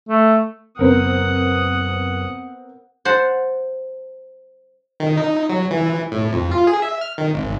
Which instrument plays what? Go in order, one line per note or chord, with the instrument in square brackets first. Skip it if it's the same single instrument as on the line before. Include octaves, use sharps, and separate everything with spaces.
[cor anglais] A3
[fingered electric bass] F#1 [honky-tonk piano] B3 C4 A#4 [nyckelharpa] F#5 D#6
[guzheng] C5 F#5 A5
[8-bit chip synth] D#3
D#4
F#3
E3
A2
F2
F4
G#4
E5
F6
D#3
G#1